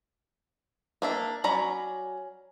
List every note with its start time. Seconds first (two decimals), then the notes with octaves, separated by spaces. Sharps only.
1.02 A#3 D4 E5
1.44 F#3 C#4 D5 A#5 B5